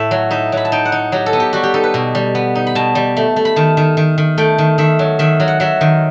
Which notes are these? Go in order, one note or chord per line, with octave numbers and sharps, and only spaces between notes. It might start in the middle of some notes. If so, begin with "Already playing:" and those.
Already playing: A2 E5
F#3
D#4 E5
F#3 B5
A5
D#4 G5
F#5
D#4
F#3 G4
A4
B3
G4
G3 F#4
G4
D#4 A4
B4
B2
G3
B3
D#4
B5
B2 A5
G3
A3
A3
B5
D#3 A5
D#3
D#3
D#3
A3 G5
D#3
D#3 E5
F#3
D#3 E5
F#3
F#5
F#3 E5
D#3